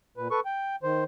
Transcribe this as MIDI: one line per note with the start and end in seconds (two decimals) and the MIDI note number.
0.17 0.28 46
0.17 0.28 71
0.31 0.40 69
0.31 0.40 71
0.31 0.40 85
0.45 0.76 79
0.83 1.04 51
0.83 1.04 72